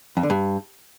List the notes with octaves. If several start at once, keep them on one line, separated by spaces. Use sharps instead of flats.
F2
D3
G2